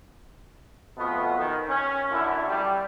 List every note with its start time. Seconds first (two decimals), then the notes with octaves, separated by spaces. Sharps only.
0.98 F2 B2 A3 B3 F4
1.39 D#3
1.68 C#4
2.12 F#2 D3 E4
2.48 G3